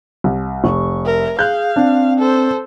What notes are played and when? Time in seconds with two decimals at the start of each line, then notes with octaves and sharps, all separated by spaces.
0.24 C2
0.64 F1 C#6
1.05 A#4 E5
1.39 G#4 F5 F#6 G6
1.76 C4 D4
2.18 A4 C5